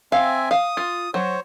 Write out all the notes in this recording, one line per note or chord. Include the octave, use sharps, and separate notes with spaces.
C4 E5 F5 G#5
F5 D#6
F4
F#3 C5 C#5